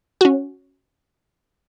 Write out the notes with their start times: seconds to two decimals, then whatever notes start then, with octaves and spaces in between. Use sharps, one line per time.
0.21 C#4 F#4